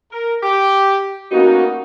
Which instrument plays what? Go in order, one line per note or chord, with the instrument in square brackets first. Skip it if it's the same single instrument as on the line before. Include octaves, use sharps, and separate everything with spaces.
[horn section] A#4
G4
[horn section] G3 B3 D#4 [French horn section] A#3 C#4 F#4